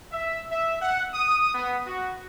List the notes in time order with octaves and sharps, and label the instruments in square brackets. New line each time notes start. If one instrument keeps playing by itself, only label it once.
[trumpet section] E5
E5
F#5
D#6
B3
F#4